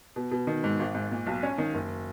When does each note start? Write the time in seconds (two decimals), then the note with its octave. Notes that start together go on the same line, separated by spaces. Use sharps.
0.16 B2
0.31 B2
0.47 D#3
0.64 G#2
0.79 G#1
0.94 G#2
1.11 A#2
1.27 B1
1.43 C#4
1.58 D#3
1.74 F#1